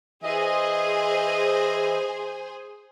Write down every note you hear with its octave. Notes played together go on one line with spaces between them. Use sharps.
E3 G#4 C5 D#5